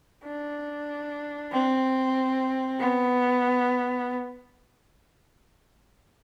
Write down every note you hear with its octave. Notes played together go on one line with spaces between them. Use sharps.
D4
C4
B3